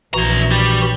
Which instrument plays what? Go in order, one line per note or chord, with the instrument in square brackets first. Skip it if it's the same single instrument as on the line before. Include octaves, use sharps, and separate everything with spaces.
[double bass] A#1 [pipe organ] E3 F#4 [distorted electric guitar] E4 A#5
[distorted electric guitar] G3 G4